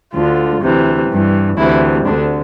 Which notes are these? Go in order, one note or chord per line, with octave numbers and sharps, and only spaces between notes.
D2 D3 F4
D2 C3 E3
G2 E3
D2 C3 E3 E4
D2 D3 D4